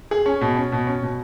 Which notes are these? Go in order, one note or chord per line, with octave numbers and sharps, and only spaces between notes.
G#4
C#4
B2
C#4
B2
C#4
B2